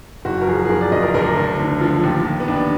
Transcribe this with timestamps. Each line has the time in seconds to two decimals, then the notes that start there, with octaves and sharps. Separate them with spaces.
0.25 F#1 F#4
0.42 A#4
0.47 F3 G#4
0.65 G#4
0.69 F#1 A#4
0.81 D5
0.92 F#1 D#5
1.03 A#4
1.14 D2 A#4
1.37 D2
1.59 D3
1.81 F3
2.04 D#2
2.26 D#2
2.40 B3
2.48 D#2 D4